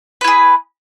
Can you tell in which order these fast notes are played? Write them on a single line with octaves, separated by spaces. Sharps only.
B4 E4 G#4